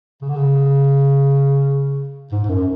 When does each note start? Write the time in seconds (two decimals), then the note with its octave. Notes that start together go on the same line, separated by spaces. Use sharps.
0.22 C#3
0.29 D3
0.37 C#3
2.32 G#2
2.44 G#2
2.49 F#2